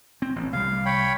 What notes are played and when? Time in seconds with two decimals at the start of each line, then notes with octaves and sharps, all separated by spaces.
0.22 C4
0.36 A1
0.53 C2 G3 F5
0.86 C#5 G5 B5